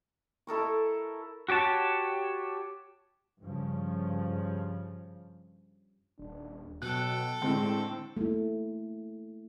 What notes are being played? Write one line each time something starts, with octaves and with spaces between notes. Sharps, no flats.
E4 A4 A#4 C#6
F#4 G4 C#5 A5
G2 C#3 F3
D#1 D4
B2 F#3 A4 G5 F#6
A2 D3 G#3 C4
A3 A#3 E4